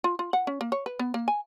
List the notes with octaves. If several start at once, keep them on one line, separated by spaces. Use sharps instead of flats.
F4
F4
F#5
C#4
A#3
C#5
B4
B3
A#3
G#5